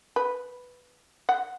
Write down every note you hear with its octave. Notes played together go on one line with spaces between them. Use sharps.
B4
F#5